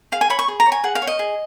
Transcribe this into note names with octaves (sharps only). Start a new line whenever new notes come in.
G#4 F5
G#5
C#5 B5
C#6
G#4
A#5
C#5
G#5
G#4 F#5
F5
C#5
D#5
G#4